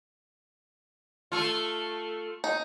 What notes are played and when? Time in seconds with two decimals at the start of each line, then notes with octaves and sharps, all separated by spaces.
1.32 A3 F4
2.44 D#4